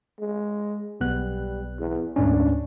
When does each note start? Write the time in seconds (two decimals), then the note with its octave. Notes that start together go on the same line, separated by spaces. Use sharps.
0.20 G#3
1.00 B1 G3 B3 F#6
1.79 E2
2.16 D2 G#2 C#4 D4